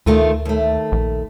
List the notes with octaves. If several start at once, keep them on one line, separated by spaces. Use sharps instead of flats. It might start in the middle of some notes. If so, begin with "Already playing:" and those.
D2 D#3 A3 F4
D#2 A3
A#1